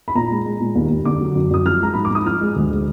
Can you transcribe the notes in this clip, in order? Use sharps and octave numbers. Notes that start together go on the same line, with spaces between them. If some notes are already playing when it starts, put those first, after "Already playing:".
B5
A#2 A#5
G#3
G#3
A#2
D#2
D#2
D3 D6
F#3
F#2
F#2 D#6
F3 F6
G#3 A#5
G#2 B5
D6
G#2 D#6
F3 F6
G#3
D2
G#3